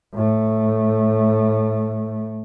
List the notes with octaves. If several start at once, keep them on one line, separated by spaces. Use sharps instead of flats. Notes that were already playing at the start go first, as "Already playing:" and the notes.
A2 A3